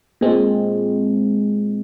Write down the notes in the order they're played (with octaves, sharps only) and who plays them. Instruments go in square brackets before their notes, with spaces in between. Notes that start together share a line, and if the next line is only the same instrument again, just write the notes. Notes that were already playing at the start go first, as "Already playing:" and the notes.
[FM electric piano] A#2 G#3 C4